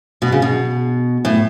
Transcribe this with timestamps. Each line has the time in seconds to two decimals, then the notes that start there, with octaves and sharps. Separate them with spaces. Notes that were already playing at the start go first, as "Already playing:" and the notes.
0.22 B2
0.32 C#3
0.42 B2
1.25 A2